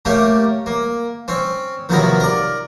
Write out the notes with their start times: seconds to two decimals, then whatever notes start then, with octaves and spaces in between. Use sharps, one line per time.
0.05 A3 A#3 C#4 G4
0.66 A#3
1.28 C4 C#4
1.89 D#2 C3 F3 F#3 B3 A#4
2.20 A#4 D5